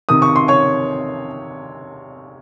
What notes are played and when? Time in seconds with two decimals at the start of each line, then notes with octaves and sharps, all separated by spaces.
0.09 C3 D#3 D#6
0.22 C#6
0.36 C6
0.48 C#5 C#6